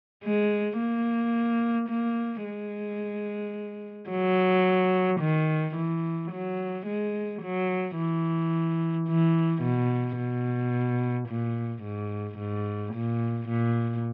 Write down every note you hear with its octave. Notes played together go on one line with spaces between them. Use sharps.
G#3
A#3
A#3
G#3
F#3
D#3
E3
F#3
G#3
F#3
E3
E3
B2
B2
A#2
G#2
G#2
A#2
A#2